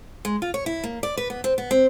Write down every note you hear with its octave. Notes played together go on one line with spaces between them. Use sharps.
G#3
F4
C#5
E4
A#3
D5
B4
B3
C4
B3
C4